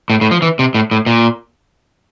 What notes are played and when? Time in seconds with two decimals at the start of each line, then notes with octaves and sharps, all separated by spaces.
0.10 A2
0.21 A2
0.31 F3
0.42 E3
0.59 C3
0.74 A2
0.91 A2
1.06 A#2